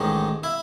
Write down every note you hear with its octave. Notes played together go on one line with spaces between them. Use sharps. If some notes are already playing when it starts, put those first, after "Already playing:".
Already playing: A1 G#2 D#3
E4